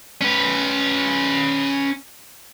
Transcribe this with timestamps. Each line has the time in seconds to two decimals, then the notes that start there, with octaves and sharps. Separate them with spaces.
0.21 C#4 B4